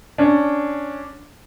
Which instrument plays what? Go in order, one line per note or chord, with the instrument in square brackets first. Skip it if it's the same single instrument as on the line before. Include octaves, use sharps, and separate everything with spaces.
[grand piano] C#4 D4